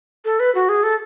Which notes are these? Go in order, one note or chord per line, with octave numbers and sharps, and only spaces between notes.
A4
B4
F#4
G#4
A4